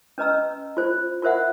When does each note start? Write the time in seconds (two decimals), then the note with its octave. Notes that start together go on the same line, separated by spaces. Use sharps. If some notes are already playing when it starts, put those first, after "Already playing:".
0.18 C#4 B4 D#5 A#5 E6
0.77 F4 C5
1.22 F4 A#4 C5 E5 F#5